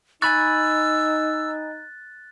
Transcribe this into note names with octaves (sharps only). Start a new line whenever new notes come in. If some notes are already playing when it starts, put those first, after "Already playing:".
D#4 G#5 B5 C#6 E6 F#6 A6